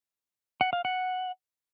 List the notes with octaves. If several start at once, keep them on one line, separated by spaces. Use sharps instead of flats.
F#5
F5
F#5